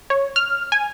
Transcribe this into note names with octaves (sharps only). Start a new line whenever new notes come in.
C#5
F6
G#5